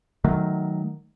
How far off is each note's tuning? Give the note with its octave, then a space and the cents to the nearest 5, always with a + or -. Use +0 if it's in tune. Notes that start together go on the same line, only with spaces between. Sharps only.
D#3 +0 F#3 +0 A3 -20